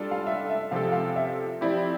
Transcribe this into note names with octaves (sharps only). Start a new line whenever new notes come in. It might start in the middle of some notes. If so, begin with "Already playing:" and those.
Already playing: G3 D4 F4 A4 D5
F5
E5
E5
C3 F3 C4 F4 A4 F5
F5
E5
F3 C4 E4 G4 D5